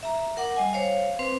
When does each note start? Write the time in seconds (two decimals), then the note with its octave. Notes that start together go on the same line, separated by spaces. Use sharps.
0.03 E5 A#5
0.37 A#4 F#5 D6
0.56 G3 D#5 G#5
0.73 C5 C#5 F5
1.19 C4 B4 C5